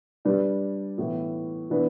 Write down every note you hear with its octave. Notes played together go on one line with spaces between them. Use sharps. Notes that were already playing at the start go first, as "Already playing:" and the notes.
G3 D4 B4
A2 E3 B3
E3 B3 D4 B4